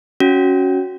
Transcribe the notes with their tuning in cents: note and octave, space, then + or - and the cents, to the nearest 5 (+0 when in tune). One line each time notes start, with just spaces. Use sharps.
C#4 +0 F#4 +0